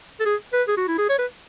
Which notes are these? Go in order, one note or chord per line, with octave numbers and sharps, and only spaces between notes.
A4
G#4
B4
G#4
F#4
E4
G#4
C#5
B4